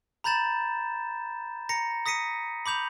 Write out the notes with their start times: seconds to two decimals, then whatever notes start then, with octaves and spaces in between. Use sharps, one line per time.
0.24 A#5 B5 G6 A6 E7
1.69 A#5 A#6 C#7
2.06 D#6 A#6 B6 C#7 D#7
2.66 B5 D6 G6 F7